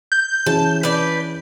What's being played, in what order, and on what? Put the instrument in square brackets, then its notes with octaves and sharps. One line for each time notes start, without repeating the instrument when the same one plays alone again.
[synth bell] G6
[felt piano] E3 C#4 G#4 [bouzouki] A5
[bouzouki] B4 D5